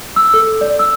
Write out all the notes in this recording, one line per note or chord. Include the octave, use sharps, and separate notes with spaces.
E6
A4
D5
E6